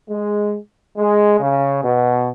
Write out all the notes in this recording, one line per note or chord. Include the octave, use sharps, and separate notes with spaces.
G#3
G#3
C#3
B2